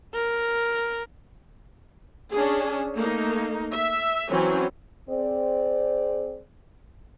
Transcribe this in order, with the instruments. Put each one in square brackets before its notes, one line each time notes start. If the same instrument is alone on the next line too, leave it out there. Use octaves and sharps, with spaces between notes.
[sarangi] A#4
[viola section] C#4 D4 G#4
A3 A#3 D#4
E5
E3 F#3 C4 C#4
[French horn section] C4 G#4 D5